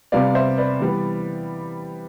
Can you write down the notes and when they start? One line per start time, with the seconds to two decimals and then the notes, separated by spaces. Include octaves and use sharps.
0.12 C3 G3 B3 D5 F5
0.35 C5 E5
0.58 B4 D5
0.80 E3 G3 B3